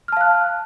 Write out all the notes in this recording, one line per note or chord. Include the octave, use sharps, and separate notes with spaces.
F5 A5 F6 F#6